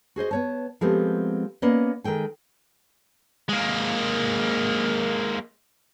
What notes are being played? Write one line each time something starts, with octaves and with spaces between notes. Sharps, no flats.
F#4 G#4 C5 D#5
B3 C#5 A5
F3 G#3 A3 B3 C4 G4
A#3 B3 C#4 D5 D#5
D#3 G#3 A4 G5 G#5
G#3 A#3